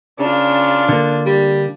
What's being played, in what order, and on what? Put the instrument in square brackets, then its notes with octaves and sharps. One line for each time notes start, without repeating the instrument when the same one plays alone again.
[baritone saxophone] C#3 [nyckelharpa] D4 F4
[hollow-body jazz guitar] D3 A#3
[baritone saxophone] G3